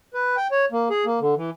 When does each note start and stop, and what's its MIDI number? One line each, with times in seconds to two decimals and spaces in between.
0.14 0.36 71
0.37 0.47 79
0.51 0.65 73
0.72 0.89 58
0.90 1.05 68
1.06 1.19 58
1.20 1.35 50
1.37 1.50 52